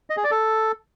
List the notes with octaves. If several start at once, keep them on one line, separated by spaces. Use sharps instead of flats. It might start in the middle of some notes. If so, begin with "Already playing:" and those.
D#5
G#4
D5
A4